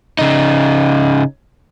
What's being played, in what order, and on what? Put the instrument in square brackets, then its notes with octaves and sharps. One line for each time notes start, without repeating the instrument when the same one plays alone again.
[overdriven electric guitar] C#3 D#4